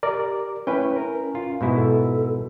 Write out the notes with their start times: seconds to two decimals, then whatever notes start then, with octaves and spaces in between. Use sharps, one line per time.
0.03 G4 A#4 D5
0.67 A3 C#4 E4 B4 G5
0.96 C#4 A#4
1.35 F4
1.61 G#2 B2 E4
1.75 A4